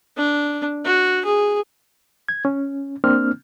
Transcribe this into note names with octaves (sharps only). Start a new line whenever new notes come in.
D4
F#4
G#4
G#6
C#4
A#3 C4 D4 F6